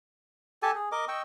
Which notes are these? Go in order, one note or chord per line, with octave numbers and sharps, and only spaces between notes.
G4 A4 G#5 A5
G#4
A#4 D#5 D6
D#5 G5 C#6 E6